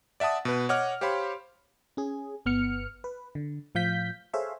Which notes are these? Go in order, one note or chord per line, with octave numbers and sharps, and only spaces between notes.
D5 E5 F#5 A5 D#6
B2 B4
C#5 D#5 F#5 D6 F6
G4 C5 C#5 F5 B5 C6
C#4 G#4
G1 B3 F6 C#7
B4
D3
A2 F3 F5 G6 B6
G#4 A4 C5 C#5 E5 F5